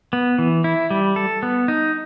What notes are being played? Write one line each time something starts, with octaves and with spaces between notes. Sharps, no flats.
B3
E3
E4
G3
A4
B3
D#4